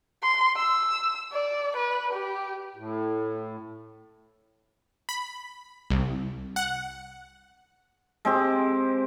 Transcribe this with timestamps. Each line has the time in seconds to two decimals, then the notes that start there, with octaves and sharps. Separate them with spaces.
0.23 C6
0.57 E6
1.33 D5
1.77 B4
2.13 G4
2.76 A2
5.09 B5
5.90 C2
6.56 F#5
8.25 G#3 C4 G4